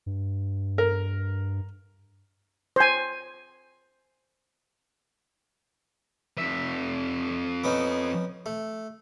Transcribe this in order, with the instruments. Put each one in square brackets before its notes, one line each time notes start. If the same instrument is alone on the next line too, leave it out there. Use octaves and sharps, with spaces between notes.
[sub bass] G2
[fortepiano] A#4
[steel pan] C5 G#5
[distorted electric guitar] F2 E5
[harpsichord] B3 C#4 D#4
A3